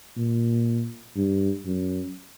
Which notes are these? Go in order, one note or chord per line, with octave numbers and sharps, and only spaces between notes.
A#2
G2
F#2